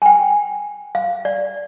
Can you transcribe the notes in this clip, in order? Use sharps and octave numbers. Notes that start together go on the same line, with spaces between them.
G#5
G5
F5
D5